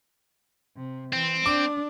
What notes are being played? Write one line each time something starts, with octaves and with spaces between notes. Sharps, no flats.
C3
E3 C4
D4 D6